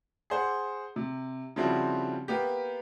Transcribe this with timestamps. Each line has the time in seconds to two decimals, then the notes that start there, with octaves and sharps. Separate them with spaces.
0.30 G#4 C5 F#5
0.96 C3
1.56 C#3 F3 G3 C4 E4 F#4
2.28 A#3 B3 G4